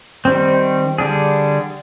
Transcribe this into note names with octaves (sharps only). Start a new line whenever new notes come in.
D#3 G3 C4
D3 G3 D4 G#4